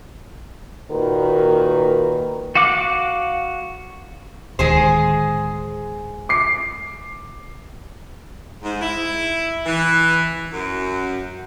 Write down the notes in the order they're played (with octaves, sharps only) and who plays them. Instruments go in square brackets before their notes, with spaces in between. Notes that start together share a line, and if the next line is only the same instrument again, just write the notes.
[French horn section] A#2 D#3 F#4 A#4 B4
[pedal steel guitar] F#4 F5 F#5 D6
[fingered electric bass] D1 D#3 [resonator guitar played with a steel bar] G#3 G#4 C5
[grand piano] D6 C7
[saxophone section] G#2
E4
E3
F#2